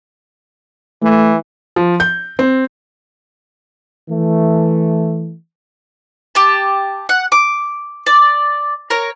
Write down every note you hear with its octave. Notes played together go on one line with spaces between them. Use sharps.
E3 A3
F3
G6
C4
E3 A3
G4 A5
F#5
D6
D5
A#4 C#5